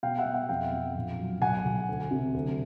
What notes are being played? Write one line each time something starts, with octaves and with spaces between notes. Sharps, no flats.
B2 F5 G5
E5 F#5
B2
E5 F#5
F2 F5 G5
F2
A#1
F#3
B1 F#5 G#5
B1
D2
C3
D2